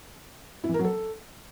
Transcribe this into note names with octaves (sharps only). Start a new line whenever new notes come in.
E4
E3
A#4
F#3
A4